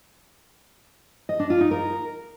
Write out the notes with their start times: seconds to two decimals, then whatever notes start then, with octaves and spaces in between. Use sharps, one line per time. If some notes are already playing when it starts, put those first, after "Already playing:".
1.29 D#5
1.40 D4
1.50 F4
1.61 D#4
1.71 A#4